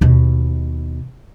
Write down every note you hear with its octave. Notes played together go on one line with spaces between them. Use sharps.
D#2 B2